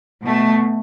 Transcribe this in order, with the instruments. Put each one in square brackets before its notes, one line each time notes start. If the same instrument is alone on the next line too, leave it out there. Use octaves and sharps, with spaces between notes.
[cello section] B2 A3